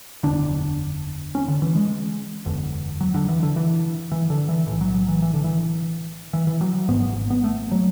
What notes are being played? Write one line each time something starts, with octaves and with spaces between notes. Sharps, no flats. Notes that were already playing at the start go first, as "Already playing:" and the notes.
F#1 E2 D3 D4
C#4
D3
E3
G#3
F#1 E2 D3
F#3
D3
E3
D3
E3
E3
D3
E3
B1 A2 E3
F#3
F#3
E3
E3
D3
E3
E3
E3
F#3
G#1 G#2 B3
B3
A3
F#3